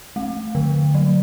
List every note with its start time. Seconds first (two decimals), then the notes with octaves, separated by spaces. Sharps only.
0.16 A3
0.55 D3
0.95 F#3